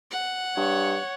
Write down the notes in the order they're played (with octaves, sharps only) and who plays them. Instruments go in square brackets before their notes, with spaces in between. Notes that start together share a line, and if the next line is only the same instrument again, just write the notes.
[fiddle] F#5
[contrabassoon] G2 [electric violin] C#5